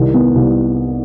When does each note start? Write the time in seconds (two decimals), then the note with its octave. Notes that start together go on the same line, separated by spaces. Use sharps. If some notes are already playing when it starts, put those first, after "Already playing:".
Already playing: C2 D#3
0.14 B3
0.36 C2